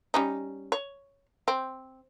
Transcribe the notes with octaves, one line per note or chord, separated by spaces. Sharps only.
G3 C#4 D#4
C#5
C4